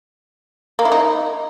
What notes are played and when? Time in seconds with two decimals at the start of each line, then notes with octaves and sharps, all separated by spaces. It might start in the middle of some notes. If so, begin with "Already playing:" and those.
0.79 A#3
0.85 E4
0.92 D#4